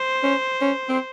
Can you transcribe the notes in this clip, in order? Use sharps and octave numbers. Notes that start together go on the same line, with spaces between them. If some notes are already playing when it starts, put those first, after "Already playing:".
Already playing: C5
C#4
C#4
C4